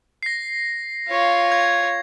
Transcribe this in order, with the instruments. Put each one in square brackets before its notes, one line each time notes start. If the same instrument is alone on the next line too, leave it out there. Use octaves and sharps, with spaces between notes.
[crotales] A#6 C7
[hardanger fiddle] F4 C#5
[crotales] G#6